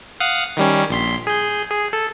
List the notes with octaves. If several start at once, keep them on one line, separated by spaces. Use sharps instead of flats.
F5 F#5 D#6
D#3 G3 C#4
A#1 C6 B6
G#4 G6
G#4
A4